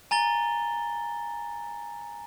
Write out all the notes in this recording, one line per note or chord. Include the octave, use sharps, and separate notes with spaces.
G#5 A#5 A6 G7